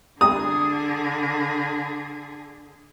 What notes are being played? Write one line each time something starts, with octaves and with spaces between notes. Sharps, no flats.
D3 G#4 D#6